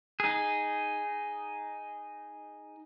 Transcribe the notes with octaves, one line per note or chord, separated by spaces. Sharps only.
D#4 G#4